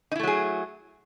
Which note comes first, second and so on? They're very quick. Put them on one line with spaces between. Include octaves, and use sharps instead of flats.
D#4 E4 A3 F#3 G#4